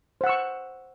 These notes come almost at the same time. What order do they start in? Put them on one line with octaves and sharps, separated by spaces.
C5 F#5 E6 C#6